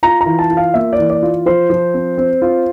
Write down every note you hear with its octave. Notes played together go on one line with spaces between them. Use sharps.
F4 A#5
A#5
E3
A5
F4
F5
A#3 E5
D5
E3
D5
F4
F3 C5
F3
C4
C4
F4